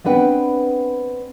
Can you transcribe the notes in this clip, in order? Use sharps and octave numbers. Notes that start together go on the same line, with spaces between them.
B3 C4 D4 B4 F#5 G5